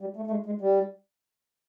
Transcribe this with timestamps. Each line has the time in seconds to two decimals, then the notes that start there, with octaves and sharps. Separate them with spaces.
0.01 G3
0.16 A3
0.27 A3
0.30 G#3
0.46 G#3
0.61 G3